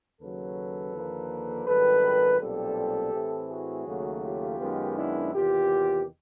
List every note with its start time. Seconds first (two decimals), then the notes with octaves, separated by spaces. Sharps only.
0.20 D#2 C#3 F#3 A4 B4
0.94 D#2 D3 F3 A#3
1.67 G#1 F#2 D#3 G3 A4 B4
2.40 B1 A#2 G3 C4 G4 A4
3.13 A2 E3 A3 C4
3.50 F#4 G#4
3.87 D#2 C#3 F#3 A3
4.23 F4 G4
4.59 F#2 D#3 G#3 B3
4.97 D4 E4
5.33 E2 C3 D#3 F4 G4